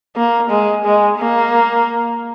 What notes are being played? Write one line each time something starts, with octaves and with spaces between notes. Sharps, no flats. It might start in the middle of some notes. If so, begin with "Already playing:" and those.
A#3
G#3
G#3
A#3